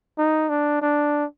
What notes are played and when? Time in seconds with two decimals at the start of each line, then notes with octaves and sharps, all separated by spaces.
0.18 D#4
0.49 D4
0.82 D4